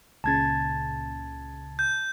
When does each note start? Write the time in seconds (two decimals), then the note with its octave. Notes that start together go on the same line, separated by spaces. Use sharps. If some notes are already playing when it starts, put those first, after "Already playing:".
0.24 C#2 A#2 C#3 A5 G#6 A6
1.79 G6